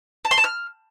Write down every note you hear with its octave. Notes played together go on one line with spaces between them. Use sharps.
A5
C6
A5
F6